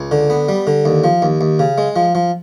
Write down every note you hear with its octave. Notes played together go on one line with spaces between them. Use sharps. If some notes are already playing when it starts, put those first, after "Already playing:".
Already playing: C#2
D3
B3
G3
D3
D#2
F3
D#2
D#2
C#3
G#3
F3
F3